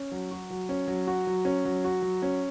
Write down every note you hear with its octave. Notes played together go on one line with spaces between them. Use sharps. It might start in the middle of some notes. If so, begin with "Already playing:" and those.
Already playing: C#4
F#3
F#4
F#3
C#4
F#3
F#4
F#3
C#4
F#3
F#4
F#3
C#4